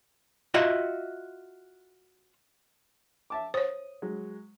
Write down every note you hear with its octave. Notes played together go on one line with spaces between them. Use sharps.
F4 F#4 D#5 E5
E5 A5 D6
C5 C#5 D#6
F#3 G#3